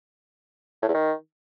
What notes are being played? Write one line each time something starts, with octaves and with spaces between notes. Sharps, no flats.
A2
E2
D#3